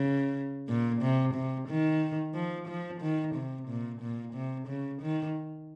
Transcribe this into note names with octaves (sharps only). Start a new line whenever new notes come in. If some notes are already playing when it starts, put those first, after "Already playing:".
Already playing: C#3
A#2
C3
C3
D#3
F3
F3
D#3
C3
A#2
A#2
C3
C#3
D#3